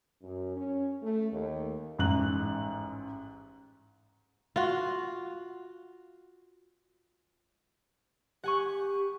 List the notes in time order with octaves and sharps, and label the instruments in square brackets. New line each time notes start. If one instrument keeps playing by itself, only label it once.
[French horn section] F#2
C#4
A3
D#2
[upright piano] A1 G#2 F#6 F#7
[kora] F4 F#4
[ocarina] G4 [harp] F#5 G#5 C#6